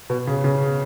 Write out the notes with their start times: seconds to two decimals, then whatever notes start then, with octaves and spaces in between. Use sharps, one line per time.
0.10 B2
0.27 C#3
0.44 C#3